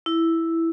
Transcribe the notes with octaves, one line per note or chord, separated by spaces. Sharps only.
E4